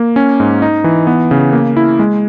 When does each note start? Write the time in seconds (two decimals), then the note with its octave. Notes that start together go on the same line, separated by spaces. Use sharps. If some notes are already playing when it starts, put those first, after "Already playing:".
Already playing: A#3
0.16 C#4
0.40 G#2
0.62 D#4
0.84 E3
1.07 B3
1.31 C#3
1.53 A#3
1.77 E4
1.99 G#3